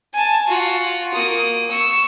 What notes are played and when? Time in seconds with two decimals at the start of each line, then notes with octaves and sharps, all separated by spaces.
0.14 G#5 A5
0.47 F4 F#4
1.14 A#3 D#6
1.70 C#6 E6